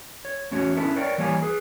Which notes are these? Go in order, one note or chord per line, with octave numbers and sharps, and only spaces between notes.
C#5
E2 A3 C#4 F#4 C#5
B3 C#4 D4 E4 A4
A#4 B4 C#5 D5 F#5 G5
E3 G3 A#3 C#5 F5 G#5
G#4 B4